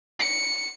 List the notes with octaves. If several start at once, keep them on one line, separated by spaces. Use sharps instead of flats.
C#7